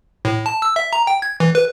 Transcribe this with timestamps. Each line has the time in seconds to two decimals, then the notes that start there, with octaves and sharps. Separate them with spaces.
0.25 A2
0.46 A5
0.62 E6
0.76 E5
0.93 A#5
1.07 G5
1.22 G#6
1.40 E3
1.55 B4